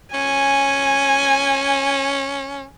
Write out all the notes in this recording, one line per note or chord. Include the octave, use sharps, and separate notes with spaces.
C#4 G#5